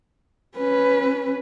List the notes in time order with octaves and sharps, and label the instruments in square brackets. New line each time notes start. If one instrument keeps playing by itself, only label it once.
[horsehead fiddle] C#4 B4